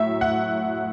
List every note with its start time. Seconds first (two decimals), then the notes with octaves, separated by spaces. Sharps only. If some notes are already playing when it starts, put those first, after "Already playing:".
Already playing: A2 F#3 E5
0.21 F#5